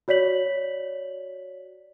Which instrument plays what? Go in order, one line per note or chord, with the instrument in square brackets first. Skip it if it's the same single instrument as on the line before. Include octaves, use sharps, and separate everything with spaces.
[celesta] F#4 C#5 D5 B6 F#7